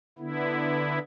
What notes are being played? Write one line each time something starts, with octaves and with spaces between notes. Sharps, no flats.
D3 B3 E4